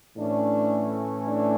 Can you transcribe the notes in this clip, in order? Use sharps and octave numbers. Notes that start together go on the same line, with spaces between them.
A2 E3 A3 C#4 D4
D4